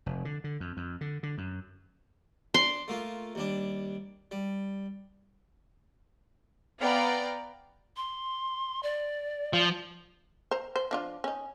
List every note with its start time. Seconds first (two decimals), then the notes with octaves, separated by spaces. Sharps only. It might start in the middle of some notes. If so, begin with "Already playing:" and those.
0.06 F1
0.25 D3
0.44 D3
0.60 F2
0.77 F2
1.01 D3
1.23 D3
1.38 F#2
2.54 D4 C6
2.88 A3 A#3 F4
3.35 D#2 G3 D4
4.31 G3
6.80 B3 D5 F5 G5 A#5
7.97 C6
8.83 D5
9.53 F3
10.51 C5 A#5
10.76 C5
10.91 F3 D4 F4
11.24 C#4 D#4